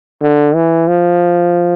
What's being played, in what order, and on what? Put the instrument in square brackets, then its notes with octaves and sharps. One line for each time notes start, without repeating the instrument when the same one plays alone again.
[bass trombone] D3
E3
F3